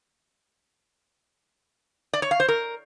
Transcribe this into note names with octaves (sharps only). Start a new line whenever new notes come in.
D5
C#5
F5
C5
A#4